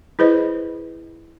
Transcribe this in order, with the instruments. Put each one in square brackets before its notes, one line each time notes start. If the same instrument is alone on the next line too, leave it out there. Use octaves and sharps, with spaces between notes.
[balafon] E4 G#4 B4 C5 D#5